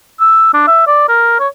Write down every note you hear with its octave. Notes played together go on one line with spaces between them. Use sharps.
E6
D4
E5
D5
A#4
C#5